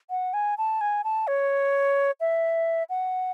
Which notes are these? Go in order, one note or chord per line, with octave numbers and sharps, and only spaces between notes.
F#5
G#5
A5
G#5
A5
C#5
E5
F#5